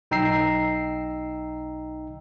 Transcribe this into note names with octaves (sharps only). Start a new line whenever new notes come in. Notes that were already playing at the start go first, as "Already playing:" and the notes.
B1 D#4 G5 A#5 E6 C7